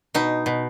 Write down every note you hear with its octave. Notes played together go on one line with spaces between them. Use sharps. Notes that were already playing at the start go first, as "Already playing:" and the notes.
B2 D#4
B2